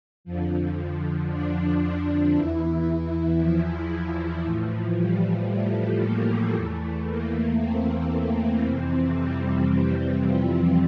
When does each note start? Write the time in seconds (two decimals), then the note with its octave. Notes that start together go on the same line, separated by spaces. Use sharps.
0.24 F2 D3 F3
0.78 F3
1.30 D4
1.82 D4
2.35 E2 E3 E4
2.86 E4
3.39 F3
3.92 F3
4.44 A2 E3
4.97 G3
5.49 A3
6.01 A#3
6.53 E2 E3 A3
7.07 A#3
7.58 C4
8.63 F2 C3 E3 C4
9.16 G3
9.68 G3
10.21 F3